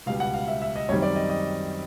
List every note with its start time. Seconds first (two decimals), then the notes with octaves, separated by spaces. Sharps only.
0.06 C#2 B2 G3 F5
0.20 F#5
0.34 F5
0.48 E5
0.62 E5
0.76 D#5
0.89 F#2 D#3 G3 C4 C#5
1.02 D5
1.16 D#5
1.30 D#5